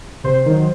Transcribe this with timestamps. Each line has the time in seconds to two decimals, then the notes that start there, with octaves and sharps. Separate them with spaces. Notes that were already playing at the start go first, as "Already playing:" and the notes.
0.24 C3 C5
0.46 D#3 F#3